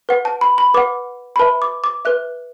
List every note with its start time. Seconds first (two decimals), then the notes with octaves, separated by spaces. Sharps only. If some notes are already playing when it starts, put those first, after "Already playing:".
0.09 B4 F#5
0.25 A5
0.41 B5
0.58 B5
0.74 B4 F#5 D6
1.36 B5
1.39 B4 E5 A5
1.62 D6
1.84 D6
2.05 B4 E5 F#6